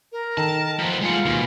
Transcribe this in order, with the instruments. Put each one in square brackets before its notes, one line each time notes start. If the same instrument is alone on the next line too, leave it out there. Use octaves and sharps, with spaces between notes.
[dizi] A#4
[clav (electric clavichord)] D#3 A4 A#5 [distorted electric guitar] A5
[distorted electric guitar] F3 B3
[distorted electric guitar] G#3 F#5 [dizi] F4
[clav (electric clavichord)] D#2 [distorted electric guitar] B2